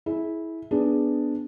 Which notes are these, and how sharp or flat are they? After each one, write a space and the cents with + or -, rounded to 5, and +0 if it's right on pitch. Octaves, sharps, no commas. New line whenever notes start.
E4 -15 G#4 +25
B3 +0 D4 +0 G#4 +0